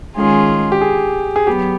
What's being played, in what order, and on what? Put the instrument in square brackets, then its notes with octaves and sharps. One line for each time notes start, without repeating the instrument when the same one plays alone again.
[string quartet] D#3 G#3 C#4 F4 G#4
[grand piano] G4
G#4
G#4
[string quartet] F#3 B3 [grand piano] G4